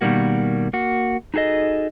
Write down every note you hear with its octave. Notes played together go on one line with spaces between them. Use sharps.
B2 D#3 F3 G3 A#3 F#4
A#3 F#4
D#4 F#4 G#4 A4 D#5